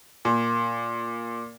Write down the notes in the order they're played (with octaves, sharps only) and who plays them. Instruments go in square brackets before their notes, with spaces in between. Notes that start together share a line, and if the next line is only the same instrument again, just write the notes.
[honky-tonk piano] A#2